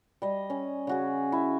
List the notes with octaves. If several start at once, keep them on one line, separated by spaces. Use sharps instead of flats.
G3 D#5
C#4
C#3 F#4 G#4
E4